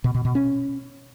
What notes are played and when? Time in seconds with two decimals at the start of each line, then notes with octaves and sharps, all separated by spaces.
0.04 B2
0.15 B2
0.25 B2
0.35 C#4